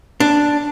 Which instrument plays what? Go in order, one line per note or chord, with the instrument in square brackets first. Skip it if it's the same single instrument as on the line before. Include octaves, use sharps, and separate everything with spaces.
[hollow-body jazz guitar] D4